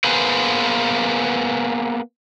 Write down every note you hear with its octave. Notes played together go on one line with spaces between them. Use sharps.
A#3 B3 G#4 B4 C5